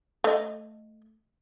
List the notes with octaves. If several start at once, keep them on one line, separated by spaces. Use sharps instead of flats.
A3 D#5